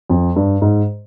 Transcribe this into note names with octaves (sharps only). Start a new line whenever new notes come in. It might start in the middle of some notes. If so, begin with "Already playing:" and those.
F2
G2
G#2